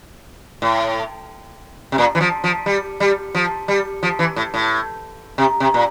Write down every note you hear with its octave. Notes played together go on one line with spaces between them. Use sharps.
A2
C3
A#2
E3
F3
F3
G3
G3
F3
G3
F3
E3
A2
A2
C3
C3
A#2